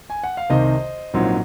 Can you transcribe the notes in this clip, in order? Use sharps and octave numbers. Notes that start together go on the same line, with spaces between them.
G#5
F#5
F5
C2 C3 D#3 C5 D#5
A#1 G#2 F#3 C4 F4